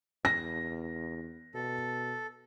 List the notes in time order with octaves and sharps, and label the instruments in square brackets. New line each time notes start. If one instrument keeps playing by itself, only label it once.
[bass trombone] E2 [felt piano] A#6
[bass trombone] B2 [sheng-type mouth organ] A4